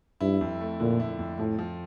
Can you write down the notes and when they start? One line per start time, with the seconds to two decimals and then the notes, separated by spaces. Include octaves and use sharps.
0.21 G2 E4
0.41 F2
0.60 A3
0.80 A#2 D3
1.00 E4
1.19 F2
1.39 A2 F3
1.59 F3